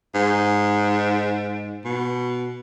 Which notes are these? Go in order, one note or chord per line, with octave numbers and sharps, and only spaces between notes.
G#2
B2